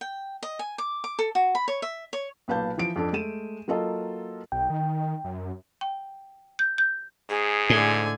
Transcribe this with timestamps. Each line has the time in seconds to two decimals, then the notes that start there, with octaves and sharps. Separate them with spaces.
0.01 G5
0.43 D#5
0.59 G#5
0.78 D6
1.04 D6
1.19 A4
1.35 F#4
1.55 B5
1.68 C#5
1.82 E5
2.13 C#5
2.48 B1 A#2 B4 F5 A5 G6
2.78 E3 F3 D7
2.96 F2 D4 A4
3.13 G#3 A3 D#7 E7
3.68 F#3 A#3 F4 A4 D#5
4.52 B1 G5
4.70 D#3
5.24 F#2
5.81 G5
6.59 G6
6.78 G6
7.30 G#2 G#4
7.70 A2 D3 G#5